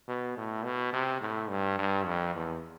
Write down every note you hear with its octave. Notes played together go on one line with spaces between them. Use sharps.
B2
A2
B2
C3
A2
G2
G2
F2
E2